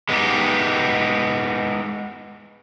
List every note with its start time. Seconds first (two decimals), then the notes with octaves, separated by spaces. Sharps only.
0.09 G#3 B3 D#4 G4